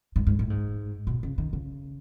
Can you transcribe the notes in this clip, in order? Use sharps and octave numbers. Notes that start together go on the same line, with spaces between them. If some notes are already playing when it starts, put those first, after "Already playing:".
G#2
G#2
A2
G#2
B2
C#3
D#3
C#3